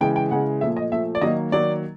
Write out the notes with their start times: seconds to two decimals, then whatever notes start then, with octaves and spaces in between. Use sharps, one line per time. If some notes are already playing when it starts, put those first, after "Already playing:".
0.01 C#3 E3 G#3 G5
0.16 G5
0.31 C#3 E3 G#3 F#5
0.61 A#2 F3 A3 E5
0.77 D#5
0.92 A#2 F3 A3 E5
1.15 D5
1.21 D#3 F#3 A#3 D#5
1.52 D#3 F#3 A#3 D5